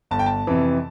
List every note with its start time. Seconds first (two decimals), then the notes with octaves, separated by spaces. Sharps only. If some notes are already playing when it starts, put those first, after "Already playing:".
0.11 G1 A5
0.19 G5
0.26 A5
0.47 F2 C3 E3